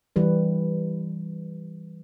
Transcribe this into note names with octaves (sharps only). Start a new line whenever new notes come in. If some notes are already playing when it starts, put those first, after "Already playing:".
E3 G3 B4